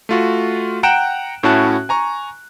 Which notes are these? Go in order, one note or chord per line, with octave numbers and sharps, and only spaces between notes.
A3 F4 F#4
F#5 G5 A#5 F#6 D7 E7
A2 C#4 E4 F#4 A5 F#6
G#5 A#5 C#6